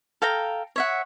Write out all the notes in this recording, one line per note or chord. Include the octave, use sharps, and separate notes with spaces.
A4 F5 G5 A#5
C#5 E5 F#5